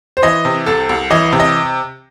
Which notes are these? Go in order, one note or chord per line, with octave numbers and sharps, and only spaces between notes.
C5
E3 D#5
C3
C2 A4
C2
E3 D#5
C3
D#5